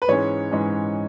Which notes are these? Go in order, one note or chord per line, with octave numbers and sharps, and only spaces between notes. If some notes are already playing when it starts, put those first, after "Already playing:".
B4
G#2 E3 G#3 C#4 C#5
G#2 E3 G#3 C#4